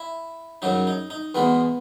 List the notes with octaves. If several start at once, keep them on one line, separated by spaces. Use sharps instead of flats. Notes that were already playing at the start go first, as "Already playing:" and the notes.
Already playing: E4
F#2 C#3 F#3 D#4
D#4
D#4
E2 B2 G#3 B3